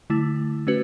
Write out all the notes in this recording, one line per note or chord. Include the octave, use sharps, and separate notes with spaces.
D3 A3 E4
A3 C#4 F#4 B4